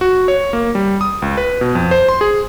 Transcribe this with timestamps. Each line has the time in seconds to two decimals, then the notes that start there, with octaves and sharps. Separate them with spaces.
0.01 F#4
0.28 C#5
0.53 A#3
0.75 G3
1.01 D#6
1.22 C#2
1.37 B4
1.61 B2
1.75 F2
1.91 C5
2.09 C6
2.21 G#4